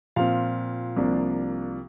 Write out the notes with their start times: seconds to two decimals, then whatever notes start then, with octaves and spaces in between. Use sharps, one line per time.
0.16 A#2 F3 C4 F5
0.96 C2 C3 F3 A#3 D4